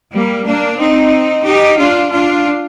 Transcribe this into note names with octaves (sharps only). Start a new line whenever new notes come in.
G3 A#3
A#3 D4
C4 D#4
D#4 G4
D4 F4
D4 F4